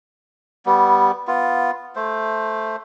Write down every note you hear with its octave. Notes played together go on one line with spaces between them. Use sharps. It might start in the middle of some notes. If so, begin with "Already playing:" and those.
G3 B3
B3 F4
A3 C5